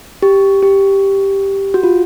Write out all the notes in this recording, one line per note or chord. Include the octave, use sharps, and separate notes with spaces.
G4
G4
F#4
F4